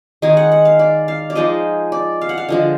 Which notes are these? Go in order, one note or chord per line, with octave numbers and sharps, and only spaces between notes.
D#3 G#3 D#4 G#5
F#5
F#5
F5
D5
F5
D5
F3 G#3 D#4 D#5
D5
F5
F#5
F5
D3 F3 G#3